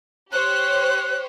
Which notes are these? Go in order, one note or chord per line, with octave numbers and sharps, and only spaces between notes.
G4 C5 C#5 F#6